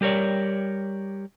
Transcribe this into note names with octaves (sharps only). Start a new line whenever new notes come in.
G3 G4 A#4 C#5 D5